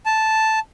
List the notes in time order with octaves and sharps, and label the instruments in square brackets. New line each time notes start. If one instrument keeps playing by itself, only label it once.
[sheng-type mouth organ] A5